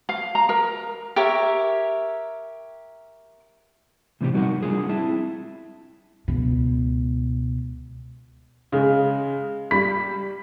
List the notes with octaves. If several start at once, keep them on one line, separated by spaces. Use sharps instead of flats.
F5
A#5
A#4
G4 A#4 C#5 E5
A2 C3 E3 C4 F4 G4
G3 D#4 F#4 A#4 F#5
G3 D4 F4 G#4
C4 E4 E5 A5
C#2 B2
C#3 G#3
G3 B5 B6